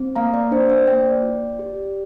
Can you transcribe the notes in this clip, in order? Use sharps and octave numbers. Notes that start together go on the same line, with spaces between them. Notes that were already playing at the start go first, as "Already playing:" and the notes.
Already playing: C4
A#3 F5 A#5
D5
D4 C5
C5
A#3 D5 G5
F4
G4